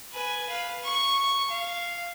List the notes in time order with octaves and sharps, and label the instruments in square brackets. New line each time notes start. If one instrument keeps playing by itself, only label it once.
[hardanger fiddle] B4 G#5
B4 F5
C#6
F5